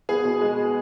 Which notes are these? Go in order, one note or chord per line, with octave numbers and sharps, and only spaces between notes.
B3 G#4
B2
G#3